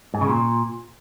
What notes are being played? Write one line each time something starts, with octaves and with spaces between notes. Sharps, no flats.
G#2
C#3
A#2